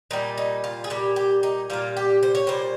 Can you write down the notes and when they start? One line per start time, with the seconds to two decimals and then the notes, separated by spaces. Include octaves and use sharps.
0.11 A#2 G3 D#4
0.38 D#4
0.64 F4
0.84 G#4
0.90 A#2 G3 G4
1.16 G4
1.43 D#4
1.70 A#2 G3 F4
1.97 G4
2.23 C5
2.35 C#5
2.47 A#2 G3 C5